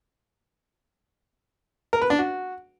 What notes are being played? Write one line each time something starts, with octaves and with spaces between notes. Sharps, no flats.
A#4
B4
D4
F#4